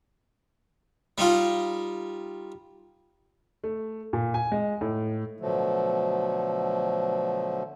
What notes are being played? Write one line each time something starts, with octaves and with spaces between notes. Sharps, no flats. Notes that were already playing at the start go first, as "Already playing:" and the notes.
G3 D#4 F4
A3
A#2
G#5
G#3
A2
B2 D3 F3 F#3 A3